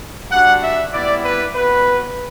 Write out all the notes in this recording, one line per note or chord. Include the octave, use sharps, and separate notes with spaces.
G3 D4 F#4 F#5
E5
G3 B3 E4 D5
B4
B3 F#4 B4